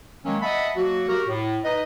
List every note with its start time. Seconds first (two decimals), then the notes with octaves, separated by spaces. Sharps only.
0.24 D#3 F#3 G#3 A#3 C#4
0.42 D#5 E5 F#5 A5 B5
0.76 F#3 A#3 F#4
1.08 F#4 G4 A#4
1.28 A2
1.64 D#4 B4 D#5